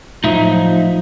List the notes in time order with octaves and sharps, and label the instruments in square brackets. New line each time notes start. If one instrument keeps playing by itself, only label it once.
[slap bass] A2 F#3 [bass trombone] F3 [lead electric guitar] D#4 E5